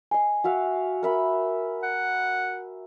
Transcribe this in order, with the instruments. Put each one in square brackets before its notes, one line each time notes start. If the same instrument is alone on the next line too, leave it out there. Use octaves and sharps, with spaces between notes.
[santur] D#5 C6 [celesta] G#5
[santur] F#4 E5 F5
A#4 E5 B5
[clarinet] F#5